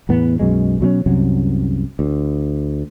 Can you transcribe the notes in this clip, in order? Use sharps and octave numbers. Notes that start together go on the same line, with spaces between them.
E2 A2 B3
B1 F#2 B2 G#3
B2 F#3 G3 C#4
C2 F#2 C3 F#3
D2